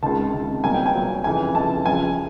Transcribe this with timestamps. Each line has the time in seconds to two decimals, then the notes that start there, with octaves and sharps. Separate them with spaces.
0.02 C#2 C3 D#3 A5
0.33 C#2 C3 D#3
0.63 C2 B2 F#3 A#3 G#5
0.74 G5
0.86 G#5
0.94 C2 B2 F#3 A#3
1.24 F2 C#3 E3 G#5
1.55 F2 C#3 E3 A5
1.86 F#2 C#3 F3 G#5